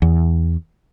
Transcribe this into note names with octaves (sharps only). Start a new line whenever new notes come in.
E2